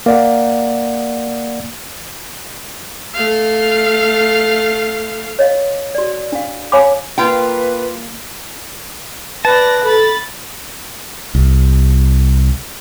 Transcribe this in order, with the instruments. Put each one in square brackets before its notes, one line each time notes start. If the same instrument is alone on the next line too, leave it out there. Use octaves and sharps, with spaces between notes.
[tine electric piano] A#3 D5 F#5
[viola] A3 F5
[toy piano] C#5 D#5 F5
F#4 D5
D4 F5
C#5 F5 G#5 A#5 B5 D6
[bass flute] A#3 [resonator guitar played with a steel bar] F4 G5 [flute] B4
[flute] B4 [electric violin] D5 A#6 [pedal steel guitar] A5
[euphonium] A4 [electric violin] B5 A6
[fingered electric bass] C2